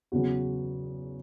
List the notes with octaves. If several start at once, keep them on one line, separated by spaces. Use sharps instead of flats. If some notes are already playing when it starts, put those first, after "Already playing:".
E2 C#3 F#3 F#4